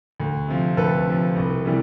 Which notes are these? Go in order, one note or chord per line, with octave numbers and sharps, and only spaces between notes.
D2
C3 F3
D2 A4 B4
C3 F3
C2
C3 E3 G3